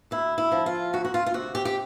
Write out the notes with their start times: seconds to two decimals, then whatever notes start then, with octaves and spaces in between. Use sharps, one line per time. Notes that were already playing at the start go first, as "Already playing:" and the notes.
0.11 D2 E4
0.38 E4
0.52 F3
0.66 F4
0.93 D2 F#4
1.05 F#4
1.14 F4
1.26 F4
1.34 C3 F#4
1.55 G4
1.65 G4